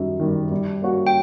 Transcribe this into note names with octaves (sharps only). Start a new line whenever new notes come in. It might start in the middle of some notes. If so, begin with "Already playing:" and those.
Already playing: F#2 D#3 G3
D#3 G3
G3
A#3 C#4 F#4
G5